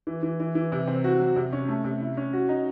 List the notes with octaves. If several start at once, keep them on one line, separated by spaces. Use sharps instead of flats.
E3
E3
E3
E3
C3
C4
F#4
F#3
C3
C#4
A3
C3
E4
C#4
F#4
D#4